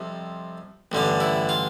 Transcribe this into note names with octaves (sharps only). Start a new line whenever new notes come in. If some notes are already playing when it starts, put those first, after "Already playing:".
Already playing: F2 C3 G3
A1 G2 D3 G3
E4
F4